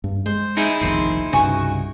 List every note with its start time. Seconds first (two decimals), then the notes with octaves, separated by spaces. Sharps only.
0.04 G2
0.26 G#3 C5
0.57 D#4 E4 G#4
0.81 F1 A#1 D#2 C4 C6
1.33 C2 G2 C#3 F#4 G#5 C#6